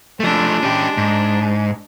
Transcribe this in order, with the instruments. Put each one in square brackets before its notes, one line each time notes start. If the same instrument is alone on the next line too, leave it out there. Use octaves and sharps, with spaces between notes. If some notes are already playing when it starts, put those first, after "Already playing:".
[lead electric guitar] F3 A3 [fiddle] G#3 D4
[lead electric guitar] C#4 G4
G#2